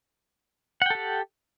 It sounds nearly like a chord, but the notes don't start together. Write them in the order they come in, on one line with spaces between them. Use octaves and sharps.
F#5 G5 A4 G4